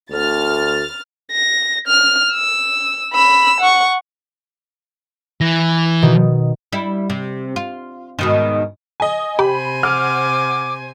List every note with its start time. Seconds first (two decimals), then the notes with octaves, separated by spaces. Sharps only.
0.10 D2 F6 A6
1.31 A#6
1.87 F6
2.32 E6
3.13 B5 E6
3.60 F#5 C#6
5.41 E3 A#6
6.02 B2 D#3
6.73 G3 E4
7.10 C3
7.56 F4
8.19 G#2 B2 D#3
9.00 D#5 G#5
9.39 C3 G4 C5 G#5 B5
9.83 F#5 D6 F6